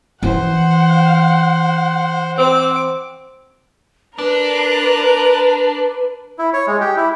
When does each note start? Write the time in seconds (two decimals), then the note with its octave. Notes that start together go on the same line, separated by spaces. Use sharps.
0.23 E3 C5 F#5
2.38 C4 D6
4.18 D4 A#4 B4 F#6
6.39 E4
6.53 C#5
6.67 G#3
6.81 G4
6.97 E4